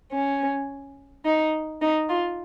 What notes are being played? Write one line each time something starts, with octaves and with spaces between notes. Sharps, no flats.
C#4
D#4
D#4
F4